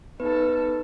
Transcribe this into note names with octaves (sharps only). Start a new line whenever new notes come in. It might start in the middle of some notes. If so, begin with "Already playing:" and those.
B3 D#4 A4 B4